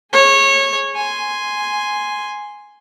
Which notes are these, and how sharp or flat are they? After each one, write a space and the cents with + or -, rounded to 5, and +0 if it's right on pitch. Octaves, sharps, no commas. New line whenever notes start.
G#4 +0 C#5 -20
G#5 +0 C6 +0